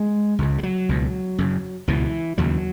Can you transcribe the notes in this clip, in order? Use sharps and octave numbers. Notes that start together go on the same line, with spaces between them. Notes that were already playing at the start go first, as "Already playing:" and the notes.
Already playing: G#3
C#2 C#3
G#3
F#3
C#2 B2
F#2 C#3
C#2 B2 E3
D#2 C#3 F#3